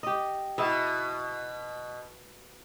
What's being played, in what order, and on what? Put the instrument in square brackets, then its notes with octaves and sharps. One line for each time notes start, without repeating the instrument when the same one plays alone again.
[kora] G4 D#5
[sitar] B2 [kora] E4 G#4